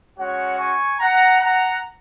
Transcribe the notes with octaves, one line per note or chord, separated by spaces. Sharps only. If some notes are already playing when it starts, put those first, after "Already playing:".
G#3 C#4 F#4 C#5 F#5
G#5 C#6
F#5 A#5
F#5 A#5